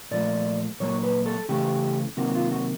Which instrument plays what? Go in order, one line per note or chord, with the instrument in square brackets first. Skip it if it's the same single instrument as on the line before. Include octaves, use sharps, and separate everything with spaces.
[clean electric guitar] A#2 F3 A3 D5
A#2 F#3 A#3 C#5
B4
A4
C#3 E3 A3 G4
C3 D#3 F#3 A#3 F#4
F4
F#4